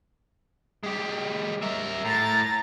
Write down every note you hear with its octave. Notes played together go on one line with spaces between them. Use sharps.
G#3 G4
A#4 E5
A2 A#5 A6